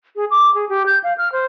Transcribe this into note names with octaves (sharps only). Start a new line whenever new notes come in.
G#4
D6
G#4
G4
G6
F5
F6
C5